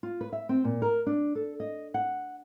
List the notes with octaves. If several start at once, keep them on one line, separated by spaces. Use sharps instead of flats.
F4
B4
E5
C4
A#2
A#4
D4
A4
D#5
F#5